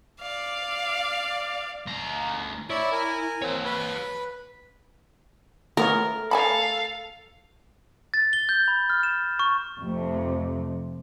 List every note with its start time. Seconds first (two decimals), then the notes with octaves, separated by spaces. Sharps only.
0.21 D5 F5
1.87 D2 A#5
2.70 E4 C#5 D5 E5 B5
2.92 A#4 G#5
3.42 C4 G4 C#5
3.65 B4 B5
5.77 G#3 A3 B3 A#4 C#5
6.31 A4 F5 G#5 A5 B5
8.14 A6
8.33 G7
8.49 G6
8.68 B5
8.90 F6
9.03 E7
9.39 C#6
9.79 F2 C3 A3